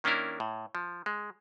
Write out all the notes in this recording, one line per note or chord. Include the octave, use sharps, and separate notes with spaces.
D#3 A#3 C#4 D4 E4 A#4
A2
F3
G#3